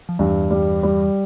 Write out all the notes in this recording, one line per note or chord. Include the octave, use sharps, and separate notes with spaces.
F3
E2 G2 E3
G3
G3